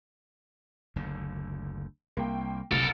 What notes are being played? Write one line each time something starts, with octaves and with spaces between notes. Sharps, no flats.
F#1 D2 D3
C2 A#3 G5
F#1 C2 A2 C3 A4 A#4